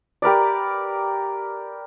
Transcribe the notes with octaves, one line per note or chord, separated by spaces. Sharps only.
G4 A#4 B4 D5